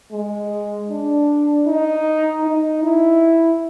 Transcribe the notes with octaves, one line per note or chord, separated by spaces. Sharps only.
G#3
D4
D#4
D#4
E4